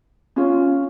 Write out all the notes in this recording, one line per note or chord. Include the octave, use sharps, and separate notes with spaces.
C#4 F4